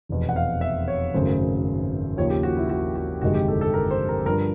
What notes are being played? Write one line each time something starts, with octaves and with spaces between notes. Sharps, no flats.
F1 E2 B2
F#5
F5
E5
C#5
G#1 F#2 C#3 F#3 A3 C5
D#2 C#3 F3 C#5
G4
F#4
E4
F#4
F#4
G1 F2 C3 D#3 G#3 F#4
G4
A4
A4
A#4
C5
A#4
G2 D3 F3 A#4